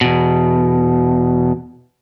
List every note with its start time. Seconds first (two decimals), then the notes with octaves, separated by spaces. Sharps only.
0.01 E2 B2